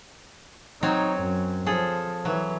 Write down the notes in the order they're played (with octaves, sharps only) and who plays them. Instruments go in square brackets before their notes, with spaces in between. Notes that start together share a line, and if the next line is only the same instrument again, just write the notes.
[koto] F#3 C4 C#5 [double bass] D#4
[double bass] F#2
[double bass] F3 [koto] G#4 A4
[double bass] E3 [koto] F#3